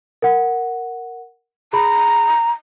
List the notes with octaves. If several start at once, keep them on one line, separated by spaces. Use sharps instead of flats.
A#4 F#5
G#4 A#5 B5